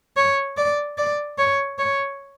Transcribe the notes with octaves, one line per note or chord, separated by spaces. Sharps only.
C#5
D5
D5
C#5
C#5